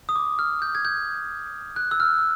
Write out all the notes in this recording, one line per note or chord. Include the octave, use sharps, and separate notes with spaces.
D#6
D6
F6
G6
G#6
G6
F#6
E6
F6